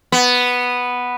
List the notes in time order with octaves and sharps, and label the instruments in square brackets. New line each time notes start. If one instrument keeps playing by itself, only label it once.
[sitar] B3